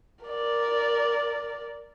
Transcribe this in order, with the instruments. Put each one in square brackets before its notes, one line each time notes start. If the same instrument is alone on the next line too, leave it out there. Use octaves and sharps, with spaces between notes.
[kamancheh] A#4 D5